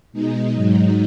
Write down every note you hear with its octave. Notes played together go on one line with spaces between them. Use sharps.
B2 G#3 D#4
G#2 F#3 D#4